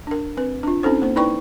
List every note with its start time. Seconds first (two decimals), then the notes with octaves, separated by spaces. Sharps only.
0.07 D4 A#4
0.37 C4 B4
0.63 D4 F4
0.83 C4 C#4 D#4 A4 C5
1.02 A#3 C5
1.16 D#4 E4 B4 D5 G5 C#6